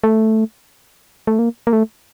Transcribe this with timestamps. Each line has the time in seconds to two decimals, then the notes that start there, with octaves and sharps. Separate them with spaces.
0.04 A3
1.27 A3
1.39 A#3
1.67 A#3
1.73 A3